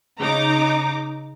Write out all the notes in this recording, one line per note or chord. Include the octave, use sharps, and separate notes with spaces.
C#3 D#4 A#5 D6